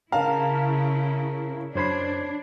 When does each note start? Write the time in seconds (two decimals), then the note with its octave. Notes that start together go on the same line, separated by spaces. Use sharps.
0.12 C#3 E4 A#4 F5 A5 A#5
1.75 F#2 D4 C5 C#5 B5 G#6 C7